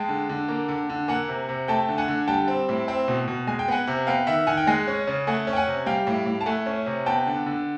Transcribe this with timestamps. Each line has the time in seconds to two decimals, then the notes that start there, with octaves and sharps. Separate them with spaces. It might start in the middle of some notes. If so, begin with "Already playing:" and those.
Already playing: G#3 G5 A5
0.09 D3
0.29 D3
0.48 A#3
0.68 D3
0.89 D3
1.08 A#3 F#5 G#5
1.28 C3
1.49 C3
1.68 A3 G5 A5
1.89 D3
1.98 F#5 G#5
2.08 D3
2.28 G3 G5 A5
2.48 C4
2.69 A2
2.88 C4
3.08 B2
3.28 B2
3.47 G#3 G#5
3.59 G5
3.68 B3 F#5 G#5
3.87 C3
4.07 B3 F5 G5
4.27 D#3 E5 F#5
4.47 D#3 F#5 G#5
4.57 G5
4.67 G#3 F#5 G#5
4.87 C#4
5.08 C#3
5.27 A3 F#5 G#5
5.47 C#4
5.53 G5
5.56 F#5 G#5
5.67 C3
5.86 G3 F5 G5
6.07 A2
6.26 A2
6.41 A5
6.46 A3 F#5 G#5
6.66 C#4
6.86 C3
7.06 B3 G5 A5
7.27 D3
7.46 D3